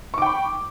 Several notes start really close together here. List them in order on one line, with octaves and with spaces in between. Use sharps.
C#6 D6 G5 B5